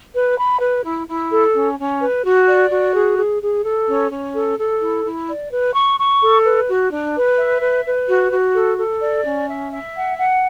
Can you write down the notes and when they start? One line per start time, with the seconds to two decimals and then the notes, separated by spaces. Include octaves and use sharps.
0.14 B4
0.38 B5
0.61 B4
0.85 E4
1.07 E4
1.31 A4
1.54 C#4
1.78 C#4
2.01 B4
2.25 F#4
2.48 D5
2.71 F#4
2.94 G#4
3.18 G#4
3.42 G#4
3.65 A4
3.88 C#4
4.11 C#4
4.35 A4
4.58 A4
4.81 E4
5.05 E4
5.28 D5
5.52 B4
5.75 C#6
5.99 C#6
6.22 A4
6.45 B4
6.68 F#4
6.91 D4
7.15 B4
7.38 E5
7.62 B4
7.85 B4
8.08 F#4
8.31 F#4
8.55 A4
8.78 A4
9.02 D5
9.25 C#4
9.48 E5
9.72 E5
9.95 F#5
10.18 F#5